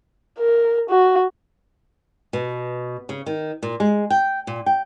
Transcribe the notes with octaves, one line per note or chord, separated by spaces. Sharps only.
A#4
F#4
B2
C#3
D#3
A#2
G#3
G5
A#2
G5